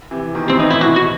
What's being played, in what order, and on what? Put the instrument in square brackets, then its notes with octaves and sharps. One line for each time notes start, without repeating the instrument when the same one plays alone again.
[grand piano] C3 E3
B2 D#3
G3 B3
[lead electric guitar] C4
[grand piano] C3 E3 [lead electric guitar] D#4
[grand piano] A2 [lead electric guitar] E4
[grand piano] B2 [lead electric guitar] F#4
[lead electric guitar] F#4